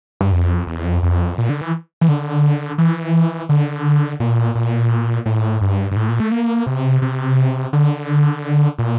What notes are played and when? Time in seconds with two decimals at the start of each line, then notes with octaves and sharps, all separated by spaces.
0.21 G2
0.32 F2
0.67 E2
0.84 F2
1.03 F2
1.38 A#2
1.49 D3
1.61 E3
2.01 E3
2.09 D3
2.78 E3
3.49 D3
4.20 A#2
4.55 A#2
5.26 A2
5.61 G2
5.91 G2
5.96 A2
6.09 A#2
6.20 A3
6.32 A#3
6.66 C3
7.02 C3
7.73 D3
8.78 A#2